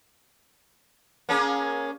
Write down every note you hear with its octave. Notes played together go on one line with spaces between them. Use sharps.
A#3 C#4 G#4